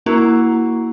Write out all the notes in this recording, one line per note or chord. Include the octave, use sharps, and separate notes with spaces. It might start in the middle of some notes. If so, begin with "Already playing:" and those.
A#3 E4 F#4 A#5